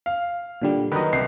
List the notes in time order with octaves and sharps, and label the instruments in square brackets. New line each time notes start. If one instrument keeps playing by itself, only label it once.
[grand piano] F5
[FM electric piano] A#2 D3 G3
[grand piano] D#3 F#3 [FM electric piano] B4 D#5
[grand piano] C2 C7